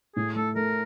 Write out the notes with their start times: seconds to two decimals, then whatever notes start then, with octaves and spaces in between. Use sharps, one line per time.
0.16 A2 G#4
0.36 A3 A4
0.56 A3 A#4